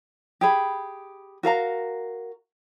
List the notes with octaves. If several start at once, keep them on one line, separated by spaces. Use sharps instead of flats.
G4 G#4 B5
F#4 A#4 F5 A#5